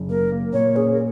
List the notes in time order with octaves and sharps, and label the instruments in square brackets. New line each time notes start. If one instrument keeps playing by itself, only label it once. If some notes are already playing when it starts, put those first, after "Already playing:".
Already playing: [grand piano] F#1
[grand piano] A#3 [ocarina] A#4
[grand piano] A#3
[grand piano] A#2 [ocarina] C#5
[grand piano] C#4 [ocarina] G#4
[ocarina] A#4